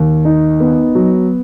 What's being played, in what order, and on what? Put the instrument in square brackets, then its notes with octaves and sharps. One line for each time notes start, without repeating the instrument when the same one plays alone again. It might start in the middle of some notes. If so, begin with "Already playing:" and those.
Already playing: [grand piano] D#2
D#4
B3
F#3